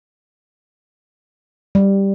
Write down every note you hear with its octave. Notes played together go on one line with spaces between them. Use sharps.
G3